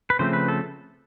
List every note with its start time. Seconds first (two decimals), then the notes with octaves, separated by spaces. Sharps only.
0.10 B4
0.19 C#3 F3 A3 C4 C5
0.33 B4
0.48 A4